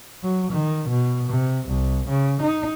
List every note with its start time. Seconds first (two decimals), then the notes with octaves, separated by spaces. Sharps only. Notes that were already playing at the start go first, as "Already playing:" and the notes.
0.23 F#3
0.52 D#3
0.89 B2
1.29 C3
1.68 C2
2.08 C#3
2.41 D#4